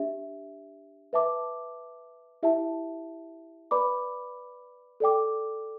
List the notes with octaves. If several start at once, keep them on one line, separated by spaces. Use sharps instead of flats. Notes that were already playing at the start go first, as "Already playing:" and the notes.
Already playing: D4 G4 E5
B4 E5 A5 D6
E4 G4 E5 A5
B4 D5 B5 D6
A4 D5 G5 D6